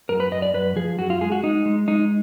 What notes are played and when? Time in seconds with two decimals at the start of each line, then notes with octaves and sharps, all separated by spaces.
0.09 F#2 A#4
0.20 B4
0.31 F#2 D#5
0.42 D5
0.54 F#2 B4
0.76 F3 G#4
0.99 F#2 F#4
1.10 F4
1.21 G#3 G#4
1.32 F#4
1.43 G#3 D#4
1.66 G#3
1.88 G#3 D#4